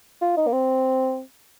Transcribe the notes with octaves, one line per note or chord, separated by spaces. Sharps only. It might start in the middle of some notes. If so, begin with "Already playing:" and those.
F4
D#4
A#3
C4